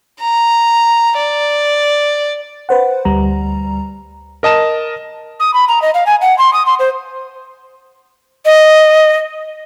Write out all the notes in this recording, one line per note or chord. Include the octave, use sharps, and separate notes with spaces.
A#5
D5
B4 C5 F#5
D2 G3 A#5
A#4 D#5 A5 E7
D#6
B5
A#5
D#5
F5
G#5
F#5
C6
D#6
C6
C5
D#5